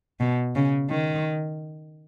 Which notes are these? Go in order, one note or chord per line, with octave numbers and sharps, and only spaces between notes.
B2
C#3
D#3